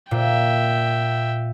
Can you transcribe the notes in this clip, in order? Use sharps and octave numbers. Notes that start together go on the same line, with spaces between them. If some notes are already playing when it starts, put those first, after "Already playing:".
A#2 E5 G5